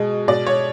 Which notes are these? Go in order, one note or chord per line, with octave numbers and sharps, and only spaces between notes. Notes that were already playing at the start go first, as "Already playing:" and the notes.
Already playing: B2 G#3
B2 D5
C#5